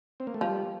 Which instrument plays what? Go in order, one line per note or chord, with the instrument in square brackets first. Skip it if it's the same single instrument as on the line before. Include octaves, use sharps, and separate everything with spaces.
[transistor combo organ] C4
A#3
A3
[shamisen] F3 [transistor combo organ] G3